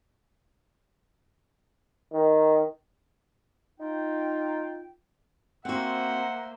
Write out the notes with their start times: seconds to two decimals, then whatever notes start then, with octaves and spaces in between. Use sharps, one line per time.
2.13 D#3
3.80 D#4 F4 G5
5.65 A#3 C4 F#4 C5 E5 F#5